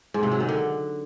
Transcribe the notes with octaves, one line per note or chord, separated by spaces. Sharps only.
G#2
C3
F#3
D#3
D3